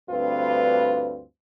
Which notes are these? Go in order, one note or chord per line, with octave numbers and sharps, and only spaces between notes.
D2 G2 C4 F4 B4